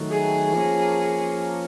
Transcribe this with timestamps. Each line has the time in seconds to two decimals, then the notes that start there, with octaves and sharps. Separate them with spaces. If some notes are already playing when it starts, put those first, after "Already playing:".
Already playing: D#3 F#3 A3
0.11 G#4
0.53 F3 A#3 C#4